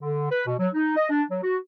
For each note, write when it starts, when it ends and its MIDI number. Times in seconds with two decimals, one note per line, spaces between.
0.01 0.27 50
0.30 0.43 71
0.46 0.54 47
0.59 0.68 54
0.73 0.94 63
0.96 1.08 75
1.09 1.22 62
1.29 1.38 54
1.43 1.56 66